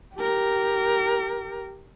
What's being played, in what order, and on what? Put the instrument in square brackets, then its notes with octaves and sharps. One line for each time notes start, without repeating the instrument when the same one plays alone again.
[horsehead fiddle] G4 A#4